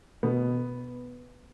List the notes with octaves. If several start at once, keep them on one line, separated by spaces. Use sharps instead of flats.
B2 B3